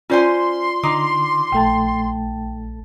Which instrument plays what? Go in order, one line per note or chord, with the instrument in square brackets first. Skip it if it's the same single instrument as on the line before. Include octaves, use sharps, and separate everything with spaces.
[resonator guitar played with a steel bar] C#4 C5 G#5 [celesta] F4 D5 [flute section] C6
[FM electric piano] D3 D6 [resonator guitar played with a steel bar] D#4
[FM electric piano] A#1 A3 A5 [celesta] G5